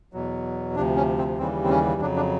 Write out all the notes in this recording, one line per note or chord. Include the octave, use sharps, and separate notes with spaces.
E2 B2 F#3
D2 C3 F3 D4
C#4
C4
D#2 C#3 E3 G3 C4
C4
C#4
F2 C#3 F#3 D4
D4